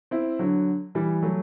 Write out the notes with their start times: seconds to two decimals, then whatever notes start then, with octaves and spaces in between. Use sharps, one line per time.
0.11 C4 E4
0.39 D3 F#3
0.95 E3 G3
1.22 F#3 A3